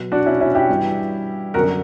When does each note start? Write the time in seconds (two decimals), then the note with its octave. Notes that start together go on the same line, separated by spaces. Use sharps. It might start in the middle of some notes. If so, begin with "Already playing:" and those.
Already playing: B2 F#3
0.12 D4 F#4
0.26 C#4 E4
0.41 C#4 E4
0.55 E4 G4
0.69 G2 E3 G3
1.54 F#2 D3 F#3 F#4 A#4